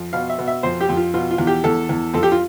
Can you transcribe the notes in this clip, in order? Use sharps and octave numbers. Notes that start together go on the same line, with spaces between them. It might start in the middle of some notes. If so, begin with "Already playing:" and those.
Already playing: F2
B2 F5
E5
B2
E5
F2 C5
G4
F2
F4
B2 F4
F4
E2
G4
E2 A4
E2
F2 A4
G4
F4